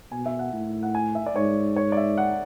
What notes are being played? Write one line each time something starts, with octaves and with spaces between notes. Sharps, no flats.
B2 G#5
E5
F#5
A2
F#5
G#5
E5
D5
G#2 C#5
C#5
D5
E5
F#5